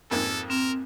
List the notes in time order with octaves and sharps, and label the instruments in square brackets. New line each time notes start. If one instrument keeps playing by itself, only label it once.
[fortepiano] F2 G#2 A#3 [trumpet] A4
[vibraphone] C4 [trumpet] A#4